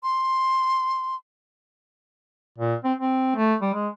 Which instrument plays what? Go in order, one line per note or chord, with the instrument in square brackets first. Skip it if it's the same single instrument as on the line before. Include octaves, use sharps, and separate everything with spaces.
[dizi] C6
[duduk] A#2
C4
C4
A3
G3
G#3